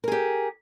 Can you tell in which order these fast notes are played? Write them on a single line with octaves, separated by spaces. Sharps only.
A#4 G#4 G4